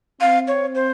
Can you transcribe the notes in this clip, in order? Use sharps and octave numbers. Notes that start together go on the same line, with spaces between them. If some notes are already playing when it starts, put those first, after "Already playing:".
C4 F5
C#5
C5